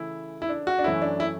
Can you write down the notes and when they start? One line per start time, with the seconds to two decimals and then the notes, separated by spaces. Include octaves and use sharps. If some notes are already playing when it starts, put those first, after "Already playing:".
Already playing: C#3 E3 A3 C#4 E4
0.42 E4
0.49 D4
0.67 F#4
0.79 D4
0.84 F#2 E3 A3 C#4 E4
1.02 D4
1.20 E4